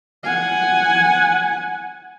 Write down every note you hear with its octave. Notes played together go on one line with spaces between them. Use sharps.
F#5 G#5